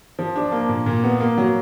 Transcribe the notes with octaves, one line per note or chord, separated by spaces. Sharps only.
F3
D4
A#3
A#2
A#2
B3
A#3
F#3